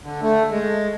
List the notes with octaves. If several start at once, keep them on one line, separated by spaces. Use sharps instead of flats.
D3
A3
G#3